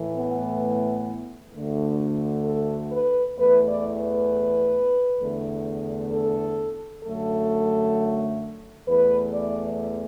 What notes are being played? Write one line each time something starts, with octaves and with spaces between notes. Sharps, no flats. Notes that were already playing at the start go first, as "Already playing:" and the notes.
Already playing: A2 E3 A3
B3
D2 D3 A3
A4
B4
E2 E3 A3 B4
D5
B4
E2 D3 A3
A4
F#2 D3 F#3 A3 A4
E2 E3 A3 B4
D5